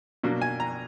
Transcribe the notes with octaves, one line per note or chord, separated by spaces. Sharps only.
B2 F#3 A#3 D4
G#5
A#5